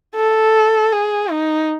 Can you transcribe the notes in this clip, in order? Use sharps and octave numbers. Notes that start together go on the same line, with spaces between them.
A4
G#4
D#4